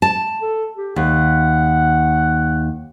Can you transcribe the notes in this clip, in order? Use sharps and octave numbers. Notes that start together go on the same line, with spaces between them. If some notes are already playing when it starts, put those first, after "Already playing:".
A5
A4
G4
D#2 F#5